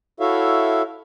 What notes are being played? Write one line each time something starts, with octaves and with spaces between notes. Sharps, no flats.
E4 F#4 A4 C#5 E5 F5